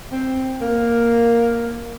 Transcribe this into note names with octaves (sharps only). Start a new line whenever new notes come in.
C4
A#3